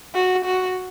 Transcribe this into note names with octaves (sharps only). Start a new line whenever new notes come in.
F#4
F#4